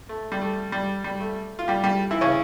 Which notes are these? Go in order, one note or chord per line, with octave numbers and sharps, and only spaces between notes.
A3
G3
A3
G3
G3
A3
F4
G3 G4
G3 G4
E3 E4
C#3 C#4